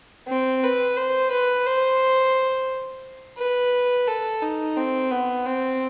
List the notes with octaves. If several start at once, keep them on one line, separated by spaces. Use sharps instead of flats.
C4
B4
C5
B4
C5
B4
A4
D#4
C4
B3
C4